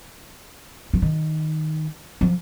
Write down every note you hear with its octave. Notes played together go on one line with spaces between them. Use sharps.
F3
D#3
F3